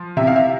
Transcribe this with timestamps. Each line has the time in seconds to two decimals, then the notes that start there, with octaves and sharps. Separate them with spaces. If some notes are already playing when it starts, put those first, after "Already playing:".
Already playing: F3
0.17 C3 E5
0.27 F5
0.36 E5